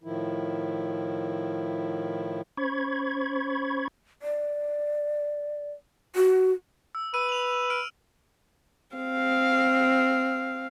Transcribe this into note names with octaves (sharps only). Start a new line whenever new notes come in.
A2 D#3 F3 E4
C#4 C5 B5 C#6 G#6
D5
F#4
E6
B4 E6 D#7
F7 F#7
F6 D7 D#7
C4 F5